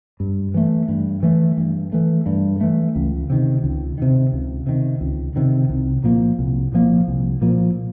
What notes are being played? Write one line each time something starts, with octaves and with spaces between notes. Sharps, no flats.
G2
E3 A3
G2
E3 A3
G2
E3 A3
G2
E3 A3
C#2
C3 D#3
C#2
C3 D#3
C#2
C3 D#3
C#2
C3 D#3
C2
A#2 F3 A#3
C2
A#2 F3 A#3
C2
A#2 F3 A#3